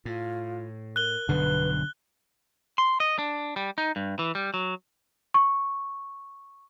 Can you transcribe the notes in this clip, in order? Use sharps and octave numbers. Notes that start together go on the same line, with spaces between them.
A2 F4
A#4 F#6 G7
B1 G2 B2 D3 B4
C6
D#5
D4
G3
D#4
G2
E3
G3
F#3
C#6